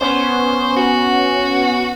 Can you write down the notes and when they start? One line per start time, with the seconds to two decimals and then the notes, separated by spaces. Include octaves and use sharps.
0.01 B3 C#4 C5
0.76 F#4